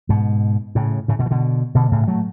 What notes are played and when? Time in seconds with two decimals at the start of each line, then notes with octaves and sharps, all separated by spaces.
0.09 G#2 B2
0.75 A2 C#3
1.08 A2 C#3
1.19 B2 D3
1.26 E3
1.31 B2 D3
1.75 B2 D3
1.92 A2 C#3
2.08 F#3 A3